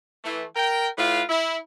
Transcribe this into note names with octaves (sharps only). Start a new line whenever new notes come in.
E3 A3
A#4 G5
A2 F4 B4 F5
E4